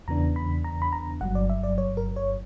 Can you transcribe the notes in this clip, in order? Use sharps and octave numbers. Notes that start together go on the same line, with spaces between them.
E2 C#3 E3 B3 D4 A#5
B5
A#5
B5
A#5
G1 G2 F#3 F#5
D5
E5
D5
C#5
A#4
C#5